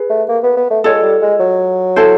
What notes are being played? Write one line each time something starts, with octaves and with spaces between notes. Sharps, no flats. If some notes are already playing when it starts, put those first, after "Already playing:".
Already playing: G#4 B4
A3
A#3
B3
B3
A3
G#3 F4 A4 C#5
G3
G#3
F#3
E4 A4 C5